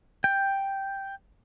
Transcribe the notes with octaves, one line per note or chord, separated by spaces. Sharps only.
G5